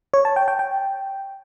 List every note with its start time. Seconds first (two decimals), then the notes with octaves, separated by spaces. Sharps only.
0.14 C#5
0.25 A5
0.36 G5
0.48 G5
0.59 G5